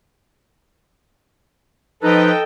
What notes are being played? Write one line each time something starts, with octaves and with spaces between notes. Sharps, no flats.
F3 D#4 A4 B4 D#5 G5